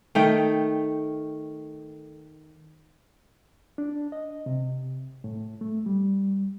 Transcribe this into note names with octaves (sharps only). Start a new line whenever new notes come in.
D#3 A3 G5
D4
D#5
C3
A2
A3
G3